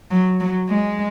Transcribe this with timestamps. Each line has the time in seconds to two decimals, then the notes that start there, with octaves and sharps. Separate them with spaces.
0.11 F#3
0.41 F#3
0.69 G#3